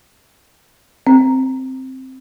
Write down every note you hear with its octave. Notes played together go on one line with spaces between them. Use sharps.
C4